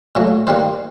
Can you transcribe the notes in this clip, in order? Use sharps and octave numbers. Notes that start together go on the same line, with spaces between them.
A#2 F#3 A3
D#3 G3 A#3 C5